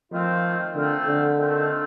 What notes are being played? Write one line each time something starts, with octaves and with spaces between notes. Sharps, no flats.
D#3 F3 A3 C4 F4
D3 D#3 A3 C4 F4
D3
D#3 A3 C4 F4